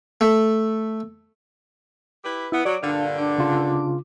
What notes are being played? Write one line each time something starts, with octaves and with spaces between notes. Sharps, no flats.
A3
E4 G4 B4
B3 E4
F#3 D5
G2 A#2 D3 D4 F5
D4 D6
C#3 F4